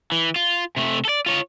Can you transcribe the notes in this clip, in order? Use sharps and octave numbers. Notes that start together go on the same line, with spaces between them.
E3
F4
C3 A3
A4 D5
F4 C#5